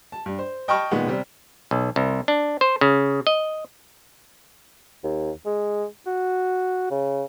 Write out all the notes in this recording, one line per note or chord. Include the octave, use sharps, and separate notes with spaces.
A5
G2
C5
D#5 G5 A5 B5 C#6 F6
A#2 D#3 G#3 B3
C3 G3 C4
B1
C2
D4
C5
C#3
D#5
D#2
G#3
F#4
C#3